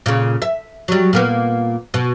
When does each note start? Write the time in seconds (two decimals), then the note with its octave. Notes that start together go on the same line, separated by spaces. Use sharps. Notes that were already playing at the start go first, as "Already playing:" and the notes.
0.06 A#2 C#3
0.42 E5
0.88 F#3 G3
1.13 A#2 A#3 B3
1.94 B2